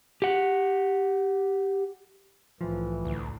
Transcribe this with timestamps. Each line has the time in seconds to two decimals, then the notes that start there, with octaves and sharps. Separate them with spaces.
0.22 G4 F#5
2.61 C2 A2 E3 F3
3.05 D2